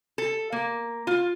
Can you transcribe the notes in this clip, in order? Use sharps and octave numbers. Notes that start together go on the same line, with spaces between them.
A4
A#3
F4